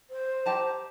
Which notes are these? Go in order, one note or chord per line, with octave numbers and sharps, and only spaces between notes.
C5
G4 A5 A#5